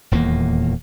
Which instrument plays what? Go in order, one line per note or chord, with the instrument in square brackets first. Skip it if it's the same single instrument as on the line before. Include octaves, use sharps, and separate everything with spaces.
[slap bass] D#1 E2 A#2 A#3